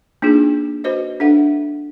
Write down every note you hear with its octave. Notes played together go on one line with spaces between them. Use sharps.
A#3 D4 D#4 F4 G#4
F#4 B4 C5 D#5
D4 A4 E5 F#5